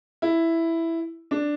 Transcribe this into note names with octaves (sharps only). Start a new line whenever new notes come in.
E4
D4